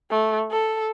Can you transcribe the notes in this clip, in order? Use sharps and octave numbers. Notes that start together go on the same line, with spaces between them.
A3
A4